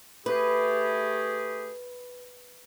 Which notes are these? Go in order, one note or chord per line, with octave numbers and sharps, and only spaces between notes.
A3 G4 G#4 B4